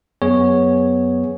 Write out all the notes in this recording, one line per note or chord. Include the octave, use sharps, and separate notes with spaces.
F#2 B3 G#4 C#5